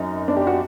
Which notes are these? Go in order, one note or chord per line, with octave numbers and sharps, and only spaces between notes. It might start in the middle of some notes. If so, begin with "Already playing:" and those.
Already playing: F#2 D#4
D4
G4
F#4